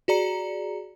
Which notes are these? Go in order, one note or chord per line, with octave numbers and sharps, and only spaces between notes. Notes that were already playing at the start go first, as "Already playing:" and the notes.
F#4 G#4 D5 A#5 C#7